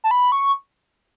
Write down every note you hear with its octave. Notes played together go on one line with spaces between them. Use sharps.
A5
B5
C#6